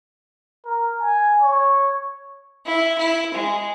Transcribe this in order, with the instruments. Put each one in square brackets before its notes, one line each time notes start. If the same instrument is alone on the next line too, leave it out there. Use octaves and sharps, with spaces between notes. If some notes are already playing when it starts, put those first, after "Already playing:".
[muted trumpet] A#4
G#5
C#5
[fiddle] E4
E4
G#3